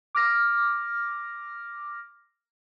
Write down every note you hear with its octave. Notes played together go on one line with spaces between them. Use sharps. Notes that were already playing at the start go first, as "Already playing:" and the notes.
D6 F6 A#6